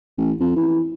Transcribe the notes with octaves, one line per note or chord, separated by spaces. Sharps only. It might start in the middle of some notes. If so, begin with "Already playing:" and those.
A1
F2
E3